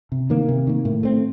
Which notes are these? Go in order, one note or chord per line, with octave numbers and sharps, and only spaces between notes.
C3
D#3 A#3
C3
D#3 A#3
A2
A3 C4